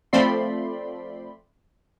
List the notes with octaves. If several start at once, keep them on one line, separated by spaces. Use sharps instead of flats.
F3 A3 C4 D5 B5 C6